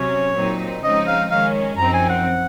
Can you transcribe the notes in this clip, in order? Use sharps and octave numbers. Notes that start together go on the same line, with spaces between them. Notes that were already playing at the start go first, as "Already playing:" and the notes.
Already playing: C3 F#3 C#4 C#5
A#2 F#3 C4 D#4
C#3 F3 G#3 C4 D#4 D#5
F5
D#3 G#3 C#4 F5
F#2 F3 C4 D#4 A#5
G#5
F#5